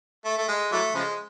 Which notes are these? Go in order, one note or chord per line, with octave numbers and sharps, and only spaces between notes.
A3
A3
G#3
E3 F#3 A3
C#3 F3 G#3